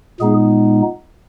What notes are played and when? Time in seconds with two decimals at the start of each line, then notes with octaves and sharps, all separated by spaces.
0.20 A#2 G#3 B3 D#4 G#4